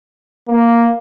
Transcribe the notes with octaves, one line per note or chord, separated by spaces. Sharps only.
A#3